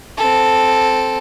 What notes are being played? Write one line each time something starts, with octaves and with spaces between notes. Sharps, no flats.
C4 A4